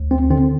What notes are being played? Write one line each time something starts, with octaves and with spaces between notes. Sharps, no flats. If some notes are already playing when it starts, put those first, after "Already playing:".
Already playing: D2
C4
D3 C4